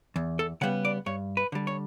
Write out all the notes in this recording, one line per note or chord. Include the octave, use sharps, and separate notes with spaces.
E2
A4
C#3 G3 B3 F#5
D5
G2 C#5
B4
D3 G3
C#5